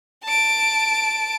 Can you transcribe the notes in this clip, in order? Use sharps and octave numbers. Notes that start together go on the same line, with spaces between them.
A5 D7